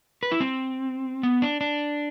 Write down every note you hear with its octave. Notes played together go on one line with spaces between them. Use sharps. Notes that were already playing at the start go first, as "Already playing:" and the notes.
B4
E4
C4
B3
D4
D4